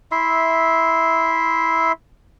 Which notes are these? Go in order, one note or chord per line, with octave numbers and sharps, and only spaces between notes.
E4 E5 C6